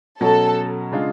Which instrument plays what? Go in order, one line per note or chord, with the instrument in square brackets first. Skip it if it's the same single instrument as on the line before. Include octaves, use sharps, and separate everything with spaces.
[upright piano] B2 F#3 C#4 [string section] A4
[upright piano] C#3 G#3 D4 F4